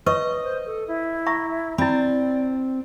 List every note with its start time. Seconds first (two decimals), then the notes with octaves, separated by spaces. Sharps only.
0.06 B4 C#5 D#5 C#6
0.43 C5
0.66 A4
0.88 E4
1.26 E5 A#5 C#6
1.78 C4 E4 D5 B5